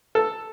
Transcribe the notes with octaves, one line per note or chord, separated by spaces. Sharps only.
A4